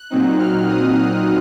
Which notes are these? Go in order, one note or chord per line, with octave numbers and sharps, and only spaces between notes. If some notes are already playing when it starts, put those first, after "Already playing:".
Already playing: F#6
A#2 F#3 C4 D#4
F6
D#6